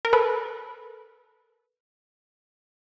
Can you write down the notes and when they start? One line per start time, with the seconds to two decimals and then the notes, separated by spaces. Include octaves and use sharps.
0.05 A#4
0.13 A4 B4